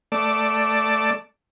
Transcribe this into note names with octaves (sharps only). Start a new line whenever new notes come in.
A3 D5